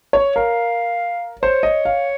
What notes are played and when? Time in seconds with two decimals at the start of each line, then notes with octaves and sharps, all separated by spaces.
0.13 C#5
0.36 A#4 F5
1.42 C5 C#5
1.63 D#5
1.85 F5